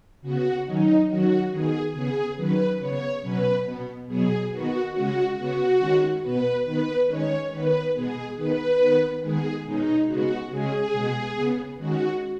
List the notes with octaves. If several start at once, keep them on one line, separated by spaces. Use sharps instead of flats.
C#3 B3 F#4
D#3 F#3 C#4 D#4
D#3 F#3 C#4 F#4
D#3 B3 G#4
C#3 B3 G#4
D#3 F#3 C#4 B4
C#3 B3 C#5
B2 F#3 C#4 B4
B2 B3
B2 F#3 B3 G#4
D#3 B3 F#4
C#3 G#3 C#4 F#4
C#3 B3 F#4
D#3 G#3 C#4
B2 B3 B4
D#3 B3 B4
D#3 G#3 C#4 C#5
D#3 B3 B4
B2 G#3 B3 G#4
D#3 B3 B4
D#3 B3
D#3 G#3 B3 G#4
B2 G#3 C#4 D#4
C#3 G#3 B3 F#4
C#3 G#3 C#4 G#4
B2 G#3 B3
C#3 B3
D#3 G#3 C#4 F#4